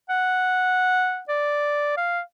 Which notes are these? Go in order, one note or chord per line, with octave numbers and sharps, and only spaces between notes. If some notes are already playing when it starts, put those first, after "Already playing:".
F#5
D5
F5